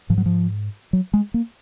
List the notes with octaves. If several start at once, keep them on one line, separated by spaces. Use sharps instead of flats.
G#2 F3
F#3
F3
F#3
G#3
A#3